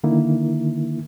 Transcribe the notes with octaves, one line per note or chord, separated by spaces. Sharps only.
D3 D#3 A#3 E4